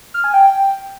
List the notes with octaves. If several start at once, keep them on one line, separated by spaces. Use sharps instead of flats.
F6
G#5
G5